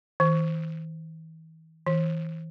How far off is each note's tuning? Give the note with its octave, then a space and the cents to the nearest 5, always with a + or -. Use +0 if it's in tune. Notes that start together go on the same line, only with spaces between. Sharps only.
E3 -45
E3 -25